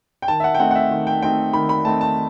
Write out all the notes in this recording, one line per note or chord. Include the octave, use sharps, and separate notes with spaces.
G5
D#3 A5
E5
F#5
G5
A3 C4 D#4 F#5
F#5
E5
D#3
G5
A3 C4 D#4 G5
D#3 B5
B5
A3 C4 D#4 A5
A5